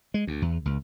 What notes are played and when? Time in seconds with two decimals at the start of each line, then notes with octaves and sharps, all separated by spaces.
0.14 G#3
0.27 D2
0.42 E2
0.65 C#2